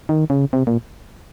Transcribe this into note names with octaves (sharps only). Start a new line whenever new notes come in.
D#3
C#3
C3
A#2